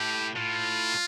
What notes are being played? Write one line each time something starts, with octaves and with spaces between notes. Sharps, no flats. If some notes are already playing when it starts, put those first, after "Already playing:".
Already playing: A2 G4
A2 F4